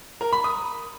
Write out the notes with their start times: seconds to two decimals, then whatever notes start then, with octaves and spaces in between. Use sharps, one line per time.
0.21 A#4
0.33 B5
0.44 D#6